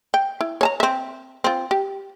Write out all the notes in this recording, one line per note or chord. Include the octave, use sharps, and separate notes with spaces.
G5
E4
C#5 A5 A#5
C4 E5
C4 F4
G4